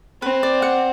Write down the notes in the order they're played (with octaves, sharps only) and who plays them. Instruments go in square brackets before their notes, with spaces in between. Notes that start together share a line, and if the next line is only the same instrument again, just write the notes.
[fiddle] C4 [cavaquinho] B4
[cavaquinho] D5
F#5